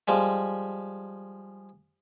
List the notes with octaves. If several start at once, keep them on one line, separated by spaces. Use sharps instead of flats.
F3 G3 G#3